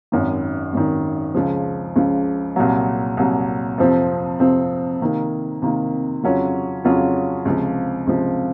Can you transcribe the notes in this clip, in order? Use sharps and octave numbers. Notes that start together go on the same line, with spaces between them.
G#1 F#2 D#3
G#1 F#2 D#3
C#2 C#3 F3
C#2 C#3 F3
C2 A#2 F#3
C2 A#2 F#3
F2 C3 F3 C4
F2 C3 F3 C4
C3 D#3 A#3
C3 D#3 A#3
F2 C#3 F#3 C#4 F4
F2 C#3 F#3 C#4 F4
C#2 C3 F3
C#2 C3 F3